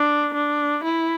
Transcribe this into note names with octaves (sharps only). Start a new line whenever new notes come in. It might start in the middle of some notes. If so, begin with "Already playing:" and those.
Already playing: D4
D4
E4